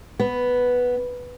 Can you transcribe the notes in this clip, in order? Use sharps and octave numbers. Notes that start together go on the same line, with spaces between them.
B3